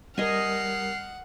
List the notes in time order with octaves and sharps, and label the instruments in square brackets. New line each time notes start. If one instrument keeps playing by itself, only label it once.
[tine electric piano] G3 A#4 [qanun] D#5 G#5 [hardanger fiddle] F#5 [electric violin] F6 C7